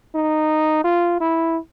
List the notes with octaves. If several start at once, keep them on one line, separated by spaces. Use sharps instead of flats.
D#4
F4
E4